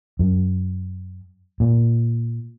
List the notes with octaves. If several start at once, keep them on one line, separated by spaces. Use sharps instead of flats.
F#2
A#2